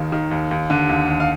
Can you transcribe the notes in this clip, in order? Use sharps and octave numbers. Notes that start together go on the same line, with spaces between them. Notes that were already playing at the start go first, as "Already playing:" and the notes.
Already playing: D#2 D#3 F5
D#3
D#2
D#2
D3
D#2
D#2
F5